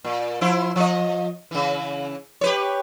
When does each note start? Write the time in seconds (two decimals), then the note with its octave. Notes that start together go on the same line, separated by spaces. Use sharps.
0.04 A#2
0.41 F3 E4 C5
0.76 F3 D#5
1.51 C#3 E3
2.41 G4 B4 C#5